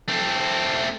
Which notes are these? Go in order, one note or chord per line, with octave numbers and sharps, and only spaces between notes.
A3 C4